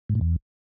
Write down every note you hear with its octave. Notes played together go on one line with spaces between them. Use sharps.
G#2
A2
E2